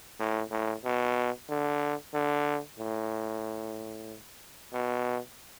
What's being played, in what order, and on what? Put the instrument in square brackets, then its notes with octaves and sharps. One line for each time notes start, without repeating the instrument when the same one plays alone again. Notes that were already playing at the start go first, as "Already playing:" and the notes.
[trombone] A2
A2
B2
D3
D3
A2
B2